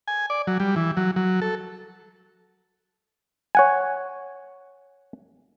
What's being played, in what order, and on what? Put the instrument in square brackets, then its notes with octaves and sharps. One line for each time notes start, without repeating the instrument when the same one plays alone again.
[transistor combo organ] G#5
D5
F#3
G3
E3
F#3
F#3
A4
[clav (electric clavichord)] C#5 F#5 G#5